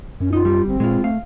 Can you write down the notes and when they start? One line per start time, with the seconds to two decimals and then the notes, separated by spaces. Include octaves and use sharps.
0.20 F#2 C#4
0.33 D#4 F4
0.45 G3
0.68 G1 C4
0.80 A#2 G#3 F4
1.04 A3 F5